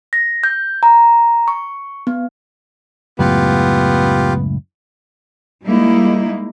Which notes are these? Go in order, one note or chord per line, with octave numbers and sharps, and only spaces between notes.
A#6
G6
A#5
C#6
B3
C#2 F#2 A2 B3 F4 G4
G3 G#3 A#3 D#4 E4